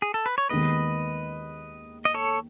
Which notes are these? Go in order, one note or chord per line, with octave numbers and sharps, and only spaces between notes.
G#4
A4
B4
C#5
D#2 D#3 G#3 B3 B4 D#5
D#5
A4 C#5